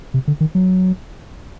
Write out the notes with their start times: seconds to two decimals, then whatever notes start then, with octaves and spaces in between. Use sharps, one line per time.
0.14 C3
0.27 D3
0.40 D#3
0.55 F#3